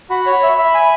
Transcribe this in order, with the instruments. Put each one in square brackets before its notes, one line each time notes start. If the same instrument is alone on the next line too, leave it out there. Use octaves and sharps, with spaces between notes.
[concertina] F#4 [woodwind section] B5
[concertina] C#5
E5
E5
G#5